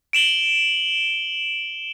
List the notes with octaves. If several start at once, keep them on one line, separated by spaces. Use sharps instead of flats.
D7 E7 F#7 G7